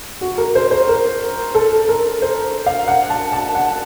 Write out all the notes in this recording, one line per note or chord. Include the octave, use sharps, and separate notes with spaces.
F#4
A#4
C5
C5
A#4
A4
A#4
C5
F5
F#5
A5
A5
F#5